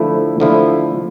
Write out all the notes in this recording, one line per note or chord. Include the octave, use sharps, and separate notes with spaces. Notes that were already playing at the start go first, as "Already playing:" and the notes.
Already playing: D3 F3 A3 E4
D3 F3 A3 E4